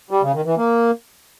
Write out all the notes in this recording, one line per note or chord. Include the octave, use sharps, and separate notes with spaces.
G3
C#3
D#3
E3
A#3